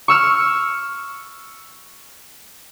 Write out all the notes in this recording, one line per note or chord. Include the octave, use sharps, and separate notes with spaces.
C#6 E6 F6